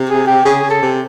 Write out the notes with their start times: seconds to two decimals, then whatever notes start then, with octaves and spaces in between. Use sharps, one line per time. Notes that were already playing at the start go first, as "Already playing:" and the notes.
Already playing: C3
0.09 G#4
0.27 G4
0.45 C#3 G#4
0.63 C#3
0.70 A4
0.82 C3